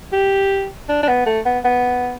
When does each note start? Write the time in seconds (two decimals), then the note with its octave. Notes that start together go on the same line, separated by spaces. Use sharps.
0.12 G4
0.89 D4
1.03 D4
1.08 B3
1.26 A3
1.46 B3
1.65 B3